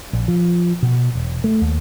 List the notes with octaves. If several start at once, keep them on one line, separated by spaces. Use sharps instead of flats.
A#1
F3
B2
E1
A3
D#2